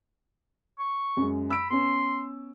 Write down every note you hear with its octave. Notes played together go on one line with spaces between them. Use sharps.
C#6
F#2 G#3
B5 E6 D7
B3 C#4 C6